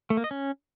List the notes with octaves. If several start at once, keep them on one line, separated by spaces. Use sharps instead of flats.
A3
A#3
D#5
C#4